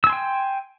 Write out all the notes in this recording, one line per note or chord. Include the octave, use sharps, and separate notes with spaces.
G5 G#5 C6 E6